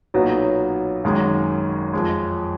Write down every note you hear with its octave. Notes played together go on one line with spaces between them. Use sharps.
B1 A#2 F#3 B3 D#4
G#1 F#2 D#3 G#3
F2 F3 G#3